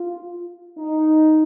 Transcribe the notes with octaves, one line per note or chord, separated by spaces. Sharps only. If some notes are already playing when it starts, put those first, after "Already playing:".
Already playing: F4
D#4